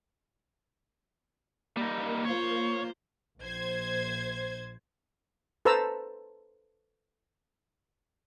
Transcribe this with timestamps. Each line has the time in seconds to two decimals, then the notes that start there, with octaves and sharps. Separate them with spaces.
1.77 G3 A#3 D#4
2.25 F4 C5 C#5
3.40 A#1 C5 G#6
5.65 A4 B4 C5 A5 A#5 E6